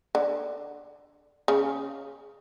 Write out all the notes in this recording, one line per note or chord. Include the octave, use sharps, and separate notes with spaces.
D3
C#3